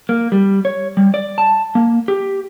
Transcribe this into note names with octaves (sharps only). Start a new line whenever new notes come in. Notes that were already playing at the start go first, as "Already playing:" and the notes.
A#3
G3
C#5
G3
D5
A5
A#3
G4